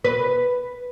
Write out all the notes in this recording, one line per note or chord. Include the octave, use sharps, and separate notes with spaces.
B4